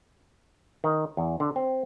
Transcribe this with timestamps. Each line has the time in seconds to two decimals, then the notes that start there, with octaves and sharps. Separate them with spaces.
0.84 D#3
1.17 E2
1.40 D3
1.56 C4